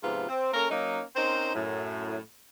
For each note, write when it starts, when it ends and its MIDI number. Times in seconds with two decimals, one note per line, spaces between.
0.03 0.28 44
0.03 0.28 48
0.03 0.28 53
0.03 0.28 59
0.03 0.28 65
0.29 0.50 60
0.53 0.69 58
0.53 0.69 61
0.53 0.69 69
0.53 0.69 70
0.70 1.00 54
0.70 1.00 58
0.70 1.00 61
0.70 1.00 63
1.16 1.52 60
1.16 1.52 61
1.16 1.52 63
1.16 1.52 70
1.16 1.52 72
1.54 2.18 42
1.54 2.18 45